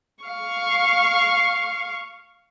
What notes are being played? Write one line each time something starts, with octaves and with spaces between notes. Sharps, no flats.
F5 C#6